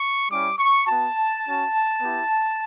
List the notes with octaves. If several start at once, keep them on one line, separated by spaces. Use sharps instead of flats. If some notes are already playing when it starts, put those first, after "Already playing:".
Already playing: C#6
G3 C#4 E4 G4 D6
C#6
B3 F#4 A5
C#4 F#4
B3 E4 G4